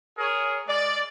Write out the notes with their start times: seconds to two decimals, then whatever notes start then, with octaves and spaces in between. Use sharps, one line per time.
0.18 G#4 A#4 C#5
0.66 G#3 D5